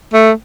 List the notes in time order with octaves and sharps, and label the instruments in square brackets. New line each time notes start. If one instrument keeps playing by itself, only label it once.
[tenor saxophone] A3